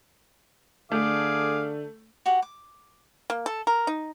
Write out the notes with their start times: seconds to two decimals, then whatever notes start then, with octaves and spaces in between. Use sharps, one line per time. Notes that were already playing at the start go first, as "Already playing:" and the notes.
0.92 D3 A3 G#4 F5 D6
2.26 F#4 G4 F#5
2.42 D6
3.30 A#3
3.46 A4
3.67 A#4
3.87 D#4